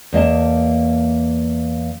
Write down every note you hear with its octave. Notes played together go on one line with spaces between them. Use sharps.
E2 A#3 D#5 A5